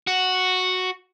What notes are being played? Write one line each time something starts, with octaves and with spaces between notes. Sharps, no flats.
F#4